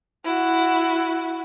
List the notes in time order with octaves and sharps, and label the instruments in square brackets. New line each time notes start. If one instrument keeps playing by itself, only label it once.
[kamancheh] E4 F#4